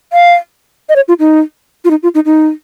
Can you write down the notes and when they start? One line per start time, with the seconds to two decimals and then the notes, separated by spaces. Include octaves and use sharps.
0.13 F5
0.89 D#5
0.96 C#5
1.08 F4
1.20 D#4
1.85 F4
1.91 D#4
2.03 F4
2.15 D#4
2.26 D#4